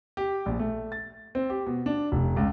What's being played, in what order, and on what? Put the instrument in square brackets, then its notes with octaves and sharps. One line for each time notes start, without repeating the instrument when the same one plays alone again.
[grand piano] G4
A#1
A3
A6
C4
G4
B2
D4
F1
C#2